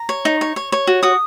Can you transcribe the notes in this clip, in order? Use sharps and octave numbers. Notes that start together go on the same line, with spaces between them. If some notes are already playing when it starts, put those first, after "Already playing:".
Already playing: A#5
C#5
D#4
C#5
C#5
C#5
F#4
F#4 D#6